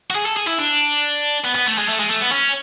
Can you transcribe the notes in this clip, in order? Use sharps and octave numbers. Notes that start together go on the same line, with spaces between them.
F#4
G#4
A4
G#4
E4
D4
B3
B3
A3
G#3
A3
G#3
A3
B3
C#4